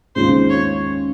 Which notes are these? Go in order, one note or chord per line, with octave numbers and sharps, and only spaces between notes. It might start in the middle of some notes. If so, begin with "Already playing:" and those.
D#2 C#3 G#3 C4 F4 C5
C#5